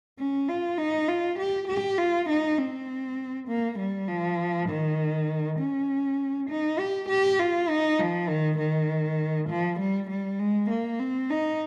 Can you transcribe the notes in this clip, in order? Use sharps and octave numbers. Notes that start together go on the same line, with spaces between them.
C#4
F4
D#4
F4
G4
G4
F4
D#4
C4
A#3
G3
F3
D#3
C#4
D#4
G4
G4
F4
D#4
F3
D#3
D#3
F3
G3
G3
G#3
A#3
C4
D#4